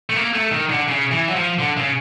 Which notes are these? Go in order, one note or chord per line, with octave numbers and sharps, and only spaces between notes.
A3
A#3
A3
D#3
D3
C#3
E3
F#3
F3
D3
C#3